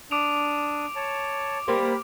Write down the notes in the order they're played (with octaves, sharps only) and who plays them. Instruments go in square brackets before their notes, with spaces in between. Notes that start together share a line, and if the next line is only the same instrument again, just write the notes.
[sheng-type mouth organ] D4 D#6 [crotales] D6 D7 F7
[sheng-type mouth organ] C#5 A5
[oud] G3 A#3 C4 [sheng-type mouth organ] G4 B5